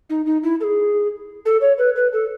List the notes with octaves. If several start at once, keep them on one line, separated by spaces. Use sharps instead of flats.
D#4
D#4
E4
A4
G#4
A4
C#5
B4
B4
A4